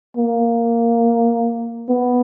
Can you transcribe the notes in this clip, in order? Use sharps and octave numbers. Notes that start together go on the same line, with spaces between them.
A#3
B3